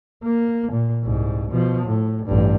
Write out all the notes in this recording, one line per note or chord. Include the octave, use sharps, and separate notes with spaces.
A#3
A#2
C2 G#2
B2 F3
A2
A1 G2